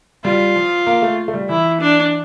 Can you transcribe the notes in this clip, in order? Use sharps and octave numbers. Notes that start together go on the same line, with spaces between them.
G3 F4
F3
A#3
A3
A3
G3
E3 E4
D4